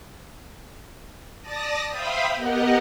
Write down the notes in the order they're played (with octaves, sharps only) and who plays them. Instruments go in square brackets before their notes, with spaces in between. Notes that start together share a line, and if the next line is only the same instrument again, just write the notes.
[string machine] D5 A5 D#6 A#6
C5 E5 F5 G5 B5 D#6
B3 G4 A#4 D#5 F#5